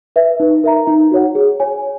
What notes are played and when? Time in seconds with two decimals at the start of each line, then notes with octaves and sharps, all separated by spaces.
0.16 B4 E5
0.40 D#4
0.64 A#4 E5 A#5
0.87 D#4
1.11 F#4 C#5 F#5
1.35 G#4
1.60 C#5 G#5